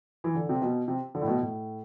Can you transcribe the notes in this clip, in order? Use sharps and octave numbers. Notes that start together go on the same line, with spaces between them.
E3
D3
C3
B2
C3
D3
A2
B2
A2